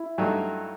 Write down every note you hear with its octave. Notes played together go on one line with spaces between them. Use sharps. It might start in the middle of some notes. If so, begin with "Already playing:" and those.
Already playing: E4
G2 F#3 A3 D#4